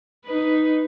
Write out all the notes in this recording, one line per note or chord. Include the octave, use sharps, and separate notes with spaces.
D#4 B4